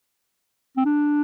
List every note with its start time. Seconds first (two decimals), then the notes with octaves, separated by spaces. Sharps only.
0.77 C4
0.86 D4